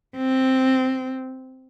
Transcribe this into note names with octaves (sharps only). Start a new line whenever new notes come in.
C4